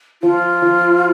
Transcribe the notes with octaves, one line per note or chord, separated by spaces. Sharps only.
F3 F4
F3